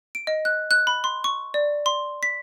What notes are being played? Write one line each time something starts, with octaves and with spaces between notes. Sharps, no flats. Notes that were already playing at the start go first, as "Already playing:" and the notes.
D7
D#5
F#6
F#6
B5
C6
C#6
D5
C6
B6